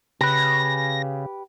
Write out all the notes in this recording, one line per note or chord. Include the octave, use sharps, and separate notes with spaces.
C#3 G4 B4 A#6